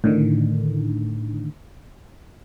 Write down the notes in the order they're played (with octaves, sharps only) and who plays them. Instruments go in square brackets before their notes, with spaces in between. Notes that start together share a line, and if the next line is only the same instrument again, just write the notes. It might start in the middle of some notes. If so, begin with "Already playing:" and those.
[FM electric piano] A2 D3 D#3